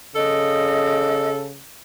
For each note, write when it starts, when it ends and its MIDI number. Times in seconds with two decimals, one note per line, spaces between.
0.16 1.61 49
0.16 1.48 69
0.16 1.28 75